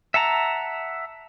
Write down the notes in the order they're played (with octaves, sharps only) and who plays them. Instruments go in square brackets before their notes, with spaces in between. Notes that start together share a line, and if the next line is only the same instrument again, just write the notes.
[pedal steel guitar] E5 F#5 A5 A#5